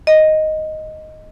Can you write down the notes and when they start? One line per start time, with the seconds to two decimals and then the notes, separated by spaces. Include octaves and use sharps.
0.07 D#5